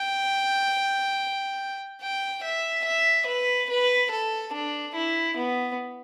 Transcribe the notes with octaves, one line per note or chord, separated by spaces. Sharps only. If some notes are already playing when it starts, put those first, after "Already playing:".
Already playing: G5
G5
E5
E5
B4
B4
A4
D4
E4
B3